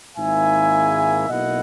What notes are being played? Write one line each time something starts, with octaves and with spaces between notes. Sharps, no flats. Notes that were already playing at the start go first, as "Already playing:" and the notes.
G#1 G#2 D#3 A#3 E4 E5 G#5
B1 B2 A#3 E4 D#5 F#5